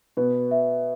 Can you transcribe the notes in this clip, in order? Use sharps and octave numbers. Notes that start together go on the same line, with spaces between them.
B2 B3 B4
E5